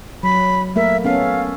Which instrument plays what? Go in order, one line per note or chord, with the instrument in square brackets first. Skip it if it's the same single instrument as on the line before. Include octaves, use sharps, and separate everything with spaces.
[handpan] F#3 [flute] B5
[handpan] A3 A#3 A#4 [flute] E5
[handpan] B3 C#4 A4 [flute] F5